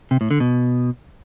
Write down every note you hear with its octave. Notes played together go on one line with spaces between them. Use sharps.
C3
A2
D3
B2